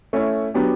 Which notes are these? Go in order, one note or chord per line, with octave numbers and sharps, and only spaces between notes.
A3 C#4 E4
F#3 B3 D4 G4